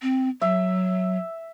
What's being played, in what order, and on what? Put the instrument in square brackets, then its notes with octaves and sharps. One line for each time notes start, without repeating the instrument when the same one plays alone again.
[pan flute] C4
[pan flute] F#3 [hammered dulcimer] E5